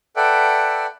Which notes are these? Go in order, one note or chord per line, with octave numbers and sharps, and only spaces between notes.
A4 B4 D5 E5 F#5 G5